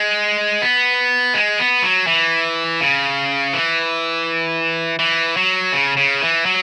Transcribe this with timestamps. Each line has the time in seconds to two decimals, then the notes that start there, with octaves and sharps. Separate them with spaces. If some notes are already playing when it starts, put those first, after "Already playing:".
Already playing: G#3
0.62 B3
1.34 G#3
1.59 B3
1.83 F#3
2.07 E3
2.81 C#3
3.53 E3
4.99 E3
5.37 F#3
5.73 C#3
5.97 C#3
6.22 E3
6.46 F#3